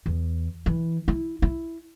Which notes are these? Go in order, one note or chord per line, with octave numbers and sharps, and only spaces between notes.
E2
E3
E4
E4